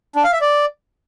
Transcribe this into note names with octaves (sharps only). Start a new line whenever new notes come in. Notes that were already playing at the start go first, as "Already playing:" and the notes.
D4
F5
E5
D5